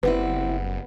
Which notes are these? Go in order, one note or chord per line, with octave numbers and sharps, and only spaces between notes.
F#1 G3 B3 C4 E4 B4